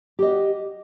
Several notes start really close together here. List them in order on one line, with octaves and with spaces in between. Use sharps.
G4 D#5 F#5